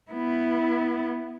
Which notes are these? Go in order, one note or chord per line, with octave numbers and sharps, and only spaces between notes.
B3 E4